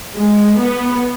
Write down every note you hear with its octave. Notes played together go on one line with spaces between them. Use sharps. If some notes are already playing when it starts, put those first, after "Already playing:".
G#3
B3